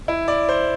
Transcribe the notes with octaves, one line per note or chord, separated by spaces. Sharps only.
E4
D5
C5